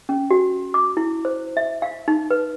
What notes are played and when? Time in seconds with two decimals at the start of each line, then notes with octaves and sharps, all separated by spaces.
0.09 C#4
0.31 F#4
0.74 D6
0.97 E4
1.25 C5
1.57 E5
1.82 F5
2.08 D#4
2.31 B4